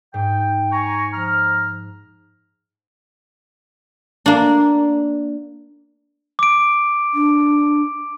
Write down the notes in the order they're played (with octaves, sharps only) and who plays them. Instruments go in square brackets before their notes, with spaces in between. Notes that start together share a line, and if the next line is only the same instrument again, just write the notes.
[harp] G#2 [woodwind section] G5
[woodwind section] G#5 A#5 C#6
F3 A#5 F6
[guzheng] A#3 D4
[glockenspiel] D6 D7
[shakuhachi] D4